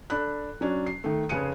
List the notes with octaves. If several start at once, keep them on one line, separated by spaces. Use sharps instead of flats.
D4 A4 B5 F#6
F#3 C#4 D4
C7
D#3 A3
F1 C#3 G#4 F#6 C#7 D#7